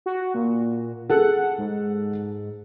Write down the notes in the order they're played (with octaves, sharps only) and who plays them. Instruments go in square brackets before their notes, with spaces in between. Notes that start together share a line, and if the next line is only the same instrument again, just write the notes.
[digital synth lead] F#4
A#2
[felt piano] G#4 A4 [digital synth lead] F#5
[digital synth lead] G#2